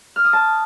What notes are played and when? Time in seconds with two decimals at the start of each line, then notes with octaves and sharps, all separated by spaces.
0.16 F6
0.25 D#6
0.33 A5